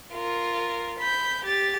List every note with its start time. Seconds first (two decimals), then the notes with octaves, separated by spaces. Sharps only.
0.13 F4 A#4
0.99 B5 G6
1.45 G4 A6